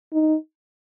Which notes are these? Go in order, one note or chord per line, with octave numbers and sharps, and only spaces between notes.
D#4